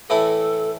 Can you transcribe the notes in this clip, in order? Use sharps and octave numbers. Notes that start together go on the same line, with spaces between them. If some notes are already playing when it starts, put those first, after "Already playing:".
A2 E3 A3 E4 A4